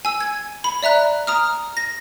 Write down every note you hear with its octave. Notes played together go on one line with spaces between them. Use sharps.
G#5 E6
G#6
B5
D5 E5 A#5 F#6
A#5 D#6 F6
A#6